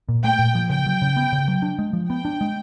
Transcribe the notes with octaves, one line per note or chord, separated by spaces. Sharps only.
A#2
A3 G5
A#2
F3
C#3 G5
F#3
C#3
B3
C#3
F#3
D4
G#3
F3
B3 G5
D4
G#3